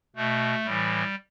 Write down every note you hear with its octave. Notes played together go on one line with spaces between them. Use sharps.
B2 A3
A2 E3 G3